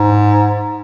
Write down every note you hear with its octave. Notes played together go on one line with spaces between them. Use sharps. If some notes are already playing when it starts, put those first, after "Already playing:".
Already playing: G#2